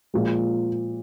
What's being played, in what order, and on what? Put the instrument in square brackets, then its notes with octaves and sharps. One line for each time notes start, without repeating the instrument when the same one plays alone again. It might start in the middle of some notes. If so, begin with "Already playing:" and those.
[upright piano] A#2 F3 G#3